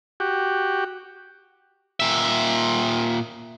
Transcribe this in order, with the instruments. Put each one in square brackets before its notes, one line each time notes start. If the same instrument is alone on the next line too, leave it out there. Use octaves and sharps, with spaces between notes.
[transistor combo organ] F#4 G4
[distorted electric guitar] A#2 E5